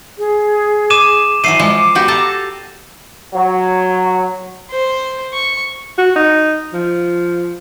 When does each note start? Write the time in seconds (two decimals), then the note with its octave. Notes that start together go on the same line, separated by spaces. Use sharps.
0.18 G#4
0.90 D6 D#7 E7
1.44 E3 F#3 A3 C7 D#7
1.59 F3 G#3 D6
1.95 B3 F#4 G4
2.08 A4 A5 A#5
3.34 F#3
4.71 C5
5.34 C#6
5.98 F#4
6.16 D#4
6.73 F3